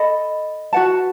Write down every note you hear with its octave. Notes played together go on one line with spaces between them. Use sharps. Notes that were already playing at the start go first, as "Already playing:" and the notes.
Already playing: A4 D#5 B5
F#4 B4 F#5 A5